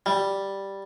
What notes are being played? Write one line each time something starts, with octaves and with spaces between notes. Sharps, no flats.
G3